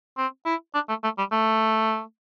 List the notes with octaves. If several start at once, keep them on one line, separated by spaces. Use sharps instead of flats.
C4
E4
D4
A3
A3
G3
A3